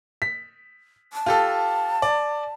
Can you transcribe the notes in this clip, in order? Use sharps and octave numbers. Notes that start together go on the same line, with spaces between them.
B6
A5
F4 G4 A4
D5